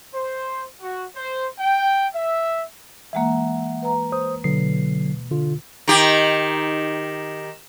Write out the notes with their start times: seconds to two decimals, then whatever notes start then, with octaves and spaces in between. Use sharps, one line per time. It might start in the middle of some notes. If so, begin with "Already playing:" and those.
0.14 C5
0.81 F#4
1.15 C5
1.58 G5
2.14 E5
3.13 E3 G#3 A#3 E5 F#5
3.82 B4 A#5
4.12 C5 D#6
4.44 B2 D3 F#3 C7
5.31 D3 F4
5.88 D#3 G4